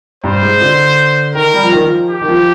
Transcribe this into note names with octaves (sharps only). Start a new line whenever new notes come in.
G2 C5
G#2
D3
D#3 A#4
G3
F3
D#3
F3
G4
D#3
F3